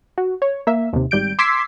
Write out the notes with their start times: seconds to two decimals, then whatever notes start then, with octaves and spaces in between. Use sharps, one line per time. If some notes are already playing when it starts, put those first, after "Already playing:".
0.18 F#4
0.42 C#5
0.67 A#3 E5
0.93 D#2 C3
1.11 G#1 G3 G6 D7
1.39 C6 D6 E6 G#6 B6 C7